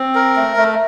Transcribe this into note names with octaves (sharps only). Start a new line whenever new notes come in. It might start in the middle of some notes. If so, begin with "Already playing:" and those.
Already playing: C4
A#4
A3
A3